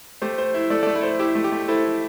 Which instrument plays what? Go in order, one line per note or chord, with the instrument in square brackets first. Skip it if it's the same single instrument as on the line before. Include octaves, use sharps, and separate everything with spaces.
[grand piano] A3 [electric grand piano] G4 C5
[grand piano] C5
E4
[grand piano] A3 [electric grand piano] A4 D5
[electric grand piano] A4 D5
[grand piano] A3
[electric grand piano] E4 A4
[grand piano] C5
[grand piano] E4 [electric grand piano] G4
[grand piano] A3
[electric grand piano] G4
[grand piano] A3
[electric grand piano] E4 A4 [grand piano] C5
[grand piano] E4